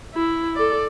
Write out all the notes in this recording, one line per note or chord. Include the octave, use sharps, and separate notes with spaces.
E4
A4 D5